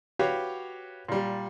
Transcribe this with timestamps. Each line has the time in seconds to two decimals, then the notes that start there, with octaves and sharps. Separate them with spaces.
0.19 F#4 G4 B4 C#5 F5
1.08 A#2 G3